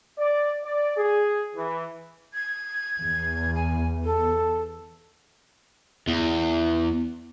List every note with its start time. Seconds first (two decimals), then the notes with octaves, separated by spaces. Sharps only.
0.19 D5
0.64 D5
0.97 G#4
1.56 E3
2.33 G#6
2.98 E2
3.54 G#5
4.03 A4
6.08 E2